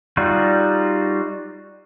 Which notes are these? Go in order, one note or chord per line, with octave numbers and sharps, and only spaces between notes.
G3 D#4 F4 F#4